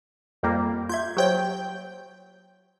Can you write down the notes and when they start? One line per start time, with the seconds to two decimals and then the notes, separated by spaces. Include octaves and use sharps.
0.43 F2 G3 A#3
0.89 F4 E5 G6 G#6
1.17 F#3 G4 C5 C#5 G5 G6